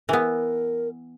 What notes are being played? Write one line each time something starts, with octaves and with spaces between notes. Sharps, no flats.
E3 B3 A#4